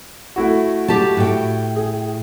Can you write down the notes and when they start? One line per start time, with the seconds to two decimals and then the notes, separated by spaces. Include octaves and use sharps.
0.36 A3 E4 F#4
0.88 G4 A5
1.17 A2 G5
1.76 G#4